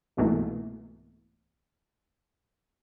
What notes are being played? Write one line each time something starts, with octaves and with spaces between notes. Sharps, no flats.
C2 G#2 B2 E3 A3 A#3